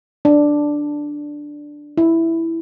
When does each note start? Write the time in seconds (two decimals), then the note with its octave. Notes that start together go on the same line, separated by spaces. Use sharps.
0.25 D4
1.97 E4